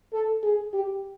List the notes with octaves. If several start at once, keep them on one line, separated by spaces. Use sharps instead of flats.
A4
G#4
G4